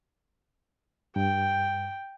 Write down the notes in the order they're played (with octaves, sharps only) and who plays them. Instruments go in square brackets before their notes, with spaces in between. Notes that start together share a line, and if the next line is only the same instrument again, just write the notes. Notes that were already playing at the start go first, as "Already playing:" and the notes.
[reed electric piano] G2 [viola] G5